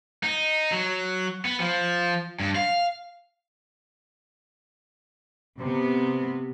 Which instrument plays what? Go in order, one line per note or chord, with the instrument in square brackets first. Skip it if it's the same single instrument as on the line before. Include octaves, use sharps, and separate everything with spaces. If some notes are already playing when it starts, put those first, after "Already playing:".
[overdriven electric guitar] D#4
F#3
B3
F3
G2
F5
[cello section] C3 B3